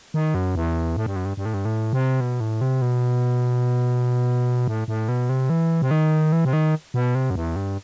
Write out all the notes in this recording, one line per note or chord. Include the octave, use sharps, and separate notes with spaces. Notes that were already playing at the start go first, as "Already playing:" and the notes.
D#3
F#2
E2
A2
G2
F#2
G2
G2
A2
G2
A2
C3
B2
A2
C3
B2
A2
A2
B2
C3
E3
C3
D#3
E3
C3
D#3
B2
C3
F#2
E2
G2